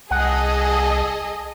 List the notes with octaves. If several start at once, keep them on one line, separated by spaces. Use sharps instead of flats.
C2 G#4 A4 D#5 F#5